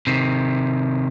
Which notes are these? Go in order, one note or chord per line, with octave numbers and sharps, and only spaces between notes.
C3 D#3